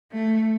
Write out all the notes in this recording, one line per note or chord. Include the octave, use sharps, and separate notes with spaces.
A3